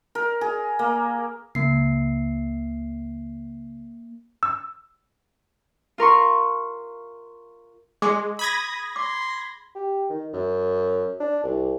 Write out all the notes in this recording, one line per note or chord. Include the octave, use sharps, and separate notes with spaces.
A#4
G#4
A#3
C#2 A#3 C7
E6
F4 A#4 C6 C#6
G#3 G#4 C6 D6
B5 D#6 G#6 A#6
C6 D6
G4
D#3
F#2
D4
C2